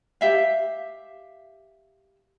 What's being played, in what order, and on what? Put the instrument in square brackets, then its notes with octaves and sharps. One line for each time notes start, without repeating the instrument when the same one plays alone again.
[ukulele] G4 E5 F5